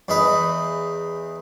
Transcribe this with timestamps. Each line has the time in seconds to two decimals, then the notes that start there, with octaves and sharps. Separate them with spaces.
0.08 E2 D#4 B4